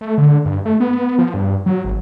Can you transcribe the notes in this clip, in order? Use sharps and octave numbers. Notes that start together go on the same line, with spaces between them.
A3
D3
G2
A3
B3
F3
G2
F#3
G#1